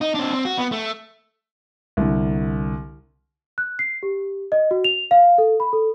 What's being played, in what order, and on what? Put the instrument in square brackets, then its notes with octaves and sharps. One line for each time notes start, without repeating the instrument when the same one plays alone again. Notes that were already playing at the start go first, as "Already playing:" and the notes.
[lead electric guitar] D#4
C4 D4
C4
F#4
B3
A3
[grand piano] C2 D3
[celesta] F#6
C7
G4
D#5
F#4
F7
F5
A4
B5
A4